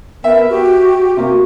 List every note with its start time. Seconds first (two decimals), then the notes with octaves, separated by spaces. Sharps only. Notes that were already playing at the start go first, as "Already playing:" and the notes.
0.24 B3 A#4 E5
0.50 F#4 G4
1.17 C3 A#3 F#4